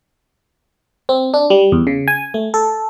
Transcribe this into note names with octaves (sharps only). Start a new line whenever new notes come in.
C4
D4
G3
E2
C#3
G#5
A3
A4